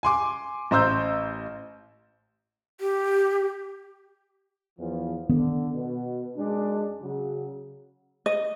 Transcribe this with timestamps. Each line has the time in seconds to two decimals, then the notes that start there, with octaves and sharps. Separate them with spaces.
0.03 G#5 C6 D6
0.71 A1 C5 A#5 E6 G6
2.81 G4
4.78 E2 F3
5.29 D3 D#3 B3
5.72 B2
6.37 F#2 G#3 D4
7.01 C#3 F#3
8.26 D#5